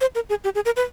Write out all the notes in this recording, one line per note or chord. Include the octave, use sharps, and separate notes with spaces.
C5
A#4
G#4
G4
G#4
A#4
B4